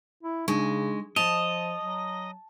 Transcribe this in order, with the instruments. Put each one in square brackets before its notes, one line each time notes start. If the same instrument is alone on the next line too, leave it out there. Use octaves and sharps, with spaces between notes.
[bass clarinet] E4
[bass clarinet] C#3 [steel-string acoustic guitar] G#3 [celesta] D4 D#4 C#6
[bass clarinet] F3 [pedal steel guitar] D#5 [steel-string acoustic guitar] A5 [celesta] F7
[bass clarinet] F#3